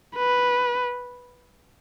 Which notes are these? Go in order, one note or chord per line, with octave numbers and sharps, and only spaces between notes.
B4